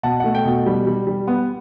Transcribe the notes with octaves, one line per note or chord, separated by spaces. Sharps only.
B2 F#5 A5
A3 F#5
G5
B2
G3
G3
G3
B3